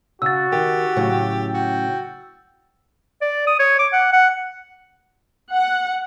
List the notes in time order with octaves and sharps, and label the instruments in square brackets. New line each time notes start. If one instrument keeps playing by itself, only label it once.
[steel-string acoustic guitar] C#3 [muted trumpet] F#4 [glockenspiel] E6 A6
[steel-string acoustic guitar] D#3 [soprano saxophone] G4
[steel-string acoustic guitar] A2 C#3 F#3
[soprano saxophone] F#4 [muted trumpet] G5
[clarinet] D5
D#6
C#5
D6
F#5
F#5
[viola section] F#5